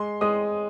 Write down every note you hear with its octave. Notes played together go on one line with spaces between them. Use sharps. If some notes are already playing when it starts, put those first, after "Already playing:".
Already playing: G#3 C6
G#3 D#6